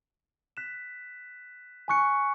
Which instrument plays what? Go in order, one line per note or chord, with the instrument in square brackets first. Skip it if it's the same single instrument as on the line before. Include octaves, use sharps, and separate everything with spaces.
[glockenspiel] F#6 B6 E7
G#5 C#6 F#6 C#7